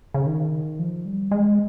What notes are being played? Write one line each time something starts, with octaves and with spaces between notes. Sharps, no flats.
C#3
D#3
F3
G3
G#3